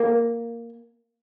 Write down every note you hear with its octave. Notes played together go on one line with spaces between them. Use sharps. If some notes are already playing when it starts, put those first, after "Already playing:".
Already playing: A#3